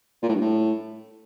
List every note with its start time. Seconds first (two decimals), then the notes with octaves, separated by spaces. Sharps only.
0.23 A#2
0.29 A2
0.35 G2
0.41 A2